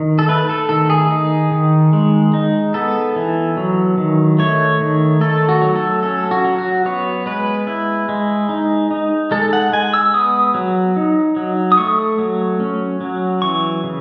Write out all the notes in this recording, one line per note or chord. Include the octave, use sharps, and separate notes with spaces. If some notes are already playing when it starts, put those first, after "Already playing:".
Already playing: D#3
A4
A3 B4
A4
D#3 A4
G#4
D#4
D#3
G#3
D#4
B3 A4
E3
F#3
D#3
A3 C#5
D#3
A3 A4
F#4
F#3
A4
C#4 A4
F#4
F#3
F#4
B3 C#5
G#3 B4
E4
G#3
D#4
D#4
G#3 A4
F#5
G#3 G#5
E6
B3 D#6
F#3
D#4
F#3
D#6
A3 C#6
F#3
C#4
F#3
E3 C#6
C#3